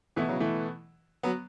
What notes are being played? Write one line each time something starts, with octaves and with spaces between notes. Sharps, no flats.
B2 E3 A3 B3 E4
C#3 F#3
E3 A3
F#3 B3